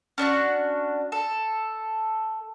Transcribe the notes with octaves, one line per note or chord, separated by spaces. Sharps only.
C#4 D4 E4 F#4
A4